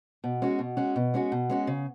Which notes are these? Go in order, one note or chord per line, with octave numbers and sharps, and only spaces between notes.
B2
G#3 C#4 F#4
B2
G#3 C#4 F#4
B2
G#3 C#4 F#4
B2
G#3 C#4 F#4
C#3